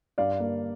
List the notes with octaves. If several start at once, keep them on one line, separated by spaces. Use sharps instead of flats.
G2 D5 F5
A#3